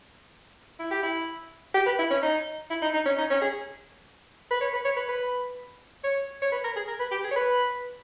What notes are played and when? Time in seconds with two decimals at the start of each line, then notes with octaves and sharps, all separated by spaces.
0.79 E4
0.90 G4
1.03 E4
1.74 G4
1.86 B4
1.98 E4
2.10 C#4
2.22 D#4
2.70 E4
2.82 D#4
2.93 D#4
3.06 C#4
3.18 D#4
3.30 C#4
3.41 G#4
4.50 B4
4.61 C#5
4.73 B4
4.85 C#5
4.96 B4
5.08 B4
6.04 C#5
6.42 C#5
6.52 B4
6.64 A#4
6.76 G#4
6.88 A#4
6.99 B4
7.11 G4
7.24 G#4
7.31 C#5
7.36 B4